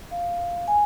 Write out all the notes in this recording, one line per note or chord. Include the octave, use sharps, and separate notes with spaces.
F5
G#5